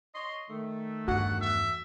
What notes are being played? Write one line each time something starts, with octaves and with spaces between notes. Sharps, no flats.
C#5 D#5 C6
D#3 A3
E2 G2 F#4 F#5
E5